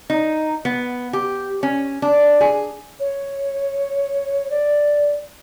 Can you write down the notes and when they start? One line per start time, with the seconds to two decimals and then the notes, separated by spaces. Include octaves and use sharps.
0.10 D#4
0.65 B3
1.13 G4
1.63 C#4
2.02 D4
2.41 G#4
3.00 C#5
4.50 D5